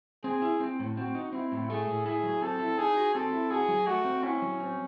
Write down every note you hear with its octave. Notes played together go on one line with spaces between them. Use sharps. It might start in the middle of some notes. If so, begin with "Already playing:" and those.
C4 G#4
E4
C4
A2
C4 F#4
D#4
C4 E4
A2
A3 G#4
A2
E4 G#4
F#3
C4 A4
E4
D#4 G#4
F#4
C4 A4
E4
F#4 G#4
F#3
A3 F#4
C4
C#4 E4
F#3
C4